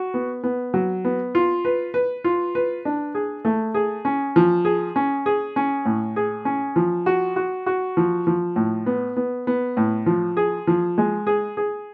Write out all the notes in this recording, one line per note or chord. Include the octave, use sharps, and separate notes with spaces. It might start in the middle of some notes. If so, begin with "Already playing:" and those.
Already playing: F#4
B3
B3
F#3
B3
F4
B4
B4
F4
B4
D4
G#4
A3
G#4
C#4
F3
G#4
C#4
G#4
C#4
A2
G#4
C#4
F3
F#4
F#4
F#4
F3
F3
A2
B3
B3
B3
A2
F3
G#4
F3
G#3
G#4
G#4